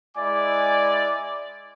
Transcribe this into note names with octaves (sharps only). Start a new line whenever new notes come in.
G#3 E4 D5 G#5 D6